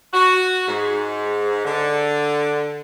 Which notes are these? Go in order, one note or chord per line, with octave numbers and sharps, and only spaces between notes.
F#4
G#2
D3